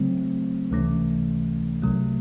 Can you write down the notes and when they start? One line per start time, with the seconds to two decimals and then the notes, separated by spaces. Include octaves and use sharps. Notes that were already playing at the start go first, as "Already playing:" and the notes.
Already playing: C#3 F#3 A3 C4
0.71 C#2 C3 E3 A3 C#4
1.82 C2 C3 F#3 A3